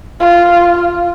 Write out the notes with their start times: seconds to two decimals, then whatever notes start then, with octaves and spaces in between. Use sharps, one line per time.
0.20 F4